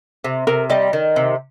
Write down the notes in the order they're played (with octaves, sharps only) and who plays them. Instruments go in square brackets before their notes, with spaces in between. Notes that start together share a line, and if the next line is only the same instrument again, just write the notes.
[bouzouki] C3
[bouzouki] C3 [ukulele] A#4
[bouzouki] G3 [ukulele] D#5
[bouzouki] D#3
C3